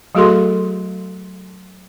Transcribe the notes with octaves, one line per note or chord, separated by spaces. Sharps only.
F#3 A3 F#4 G#4 A4 C6